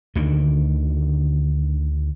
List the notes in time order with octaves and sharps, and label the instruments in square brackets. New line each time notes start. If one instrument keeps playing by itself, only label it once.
[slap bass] D2 D3 D#3